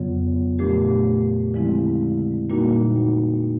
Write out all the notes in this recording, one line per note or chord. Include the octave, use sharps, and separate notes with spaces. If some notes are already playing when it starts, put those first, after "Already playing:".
Already playing: F2 C#3 F#3 B3
A#2 F3 A3 D4 G4
D3 F3 G#3 C4 E4
A#2 G3 A#3 D#4 F#4